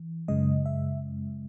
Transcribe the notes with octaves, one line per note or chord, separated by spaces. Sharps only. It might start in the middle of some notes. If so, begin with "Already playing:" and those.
Already playing: E3
F#2 C#3 G#3 D#5
E5